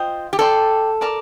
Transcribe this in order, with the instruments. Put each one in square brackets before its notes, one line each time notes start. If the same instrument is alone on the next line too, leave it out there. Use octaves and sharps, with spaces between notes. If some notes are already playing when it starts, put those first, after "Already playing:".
Already playing: [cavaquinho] F4 C5 D#5 G5
[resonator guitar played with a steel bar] G4
[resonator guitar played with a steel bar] A4 [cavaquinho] D5 G5 C6
[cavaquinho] A#4 D5 A5 D6